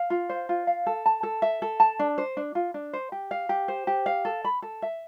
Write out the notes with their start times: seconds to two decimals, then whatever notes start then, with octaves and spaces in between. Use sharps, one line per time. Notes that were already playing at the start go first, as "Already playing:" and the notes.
Already playing: F5
0.10 F4
0.30 C5
0.49 F4
0.67 F5
0.87 A4
1.06 A5
1.23 A4
1.42 E5
1.62 A4
1.80 A5
1.99 D4
2.18 C5
2.37 D4
2.55 F4
2.74 D4
2.93 C5
3.12 G4
3.31 F5
3.49 G4
3.68 C5
3.87 G4
4.06 F5
4.25 A4
4.45 B5
4.62 A4
4.82 E5